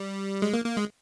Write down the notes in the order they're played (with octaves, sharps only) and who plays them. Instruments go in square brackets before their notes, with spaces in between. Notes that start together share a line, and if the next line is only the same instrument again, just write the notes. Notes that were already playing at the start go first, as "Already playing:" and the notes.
Already playing: [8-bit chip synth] G3
G#3
A#3
A#3
G#3